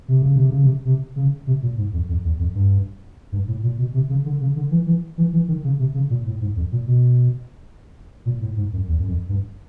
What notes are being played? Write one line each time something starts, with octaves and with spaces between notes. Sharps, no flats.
C3
C#3
C3
C#3
C3
C3
C#3
C3
A#2
G#2
F2
F2
E2
F2
G2
G2
A2
A#2
B2
C3
C#3
D3
C#3
D3
E3
E3
E3
E3
D#3
C#3
C3
C#3
A#2
A2
G#2
F2
A#2
B2
A#2
A2
G#2
F#2
E2
F#2
F2
G2